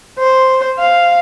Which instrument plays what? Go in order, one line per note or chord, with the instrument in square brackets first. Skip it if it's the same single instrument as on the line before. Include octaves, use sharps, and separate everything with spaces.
[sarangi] C5
F5